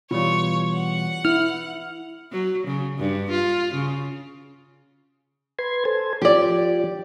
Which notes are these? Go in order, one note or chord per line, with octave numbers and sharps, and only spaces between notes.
B2 E3 G3 F4 C#5
F#5
E4 F6
F#3
C#3
G2
F4
C#3
B4 C6 G#6
A4 C5 G#5
F3 G4 D5